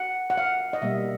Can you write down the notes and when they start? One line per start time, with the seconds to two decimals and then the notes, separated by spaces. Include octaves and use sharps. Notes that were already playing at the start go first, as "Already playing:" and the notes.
Already playing: F#5
0.30 F#5
0.37 F5
0.73 D#5
0.82 B2 G3 A#3 E5